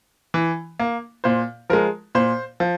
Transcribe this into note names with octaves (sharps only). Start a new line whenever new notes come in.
E3
A#3
A#2 C5
F3 G#3 A#4
A#2 C5
F3